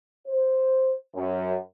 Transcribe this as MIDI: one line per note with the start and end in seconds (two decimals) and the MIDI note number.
0.28 0.95 72
1.16 1.57 42